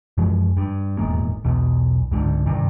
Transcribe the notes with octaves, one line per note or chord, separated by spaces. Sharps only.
F#2 E3 F3 G#3
G2
D#1 E2 G#2 A#3
B1 E2 B2
C#2 G#2 D3
G2 C3 D#3